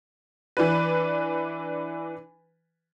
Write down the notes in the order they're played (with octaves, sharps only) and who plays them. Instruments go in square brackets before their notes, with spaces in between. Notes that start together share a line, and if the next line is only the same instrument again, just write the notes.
[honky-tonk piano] E3 D4 B4